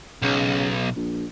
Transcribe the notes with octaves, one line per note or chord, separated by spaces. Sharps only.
B1 C#3
A#1